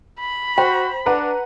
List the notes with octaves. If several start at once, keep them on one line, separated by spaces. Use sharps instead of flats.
B5
F#4 C5 G5
D4 B4 F#5 A#5